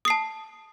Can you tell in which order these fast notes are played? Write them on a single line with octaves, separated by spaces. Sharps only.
D#6 C7 A5